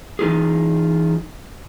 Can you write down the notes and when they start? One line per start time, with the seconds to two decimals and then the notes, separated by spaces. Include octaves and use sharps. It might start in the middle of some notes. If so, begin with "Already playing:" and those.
0.19 E3 D#4 F4 G#4